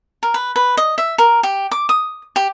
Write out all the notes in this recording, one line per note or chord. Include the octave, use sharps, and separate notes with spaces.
A#4
B4
B4
D#5
E5
A#4
G4
D6
D#6
G4